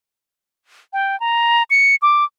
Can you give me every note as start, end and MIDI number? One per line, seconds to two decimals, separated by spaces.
0.93 1.18 79
1.20 1.63 82
1.70 1.96 97
2.02 2.24 86